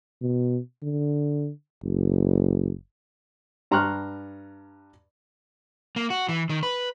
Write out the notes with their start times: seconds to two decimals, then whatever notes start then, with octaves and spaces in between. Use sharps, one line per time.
0.22 B2
0.83 D3
1.84 F#1
3.71 G2 A#5 C6 C#6 F6 F#6
5.96 A#3
6.10 F#4
6.29 E3
6.50 D#3
6.63 B4